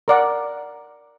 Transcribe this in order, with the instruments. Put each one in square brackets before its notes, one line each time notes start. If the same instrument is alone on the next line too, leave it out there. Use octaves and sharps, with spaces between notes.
[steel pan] A#4 D5 F#5